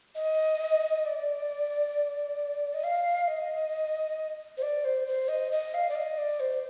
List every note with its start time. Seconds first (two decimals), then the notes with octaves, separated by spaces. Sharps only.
0.15 D#5
1.05 D5
2.74 D#5
2.84 F5
3.28 D#5
4.57 C5
4.62 D5
4.85 C5
5.07 C5
5.28 D#5
5.52 D#5
5.74 F5
5.89 D5
5.95 D#5
6.18 D5
6.40 C5